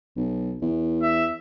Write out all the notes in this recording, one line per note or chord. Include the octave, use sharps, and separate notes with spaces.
B1
E2
E5